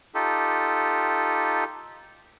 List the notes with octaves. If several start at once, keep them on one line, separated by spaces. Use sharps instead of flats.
D#4 F4 G4 A4